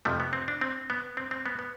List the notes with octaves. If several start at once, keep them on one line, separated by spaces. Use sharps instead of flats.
F2 C3 F3 A3
B3
C4
D4
C4
B3
C4
C4
B3
B3